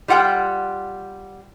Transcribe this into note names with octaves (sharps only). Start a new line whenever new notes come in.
G3 F4 F#5 G5